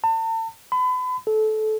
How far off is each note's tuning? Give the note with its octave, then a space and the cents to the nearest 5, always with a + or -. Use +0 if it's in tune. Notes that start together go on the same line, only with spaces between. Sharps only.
A5 +40
B5 +35
A4 -20